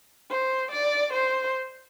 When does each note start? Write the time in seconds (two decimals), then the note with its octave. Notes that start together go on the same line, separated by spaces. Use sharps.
0.30 C5
0.71 D5
1.12 C5